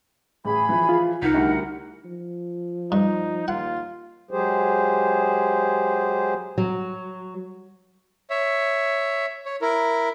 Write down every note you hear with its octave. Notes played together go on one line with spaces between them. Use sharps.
A1 G#4 B5
E3 F3
F4
C2 D#4 A#4 F#5 B6
D2 G3 E4
F3
G2 D#4
D#2 F4 F#5
F#3 G#3 G4 G#4 C5
F#3
C#5 E5
C#5
E4 A#4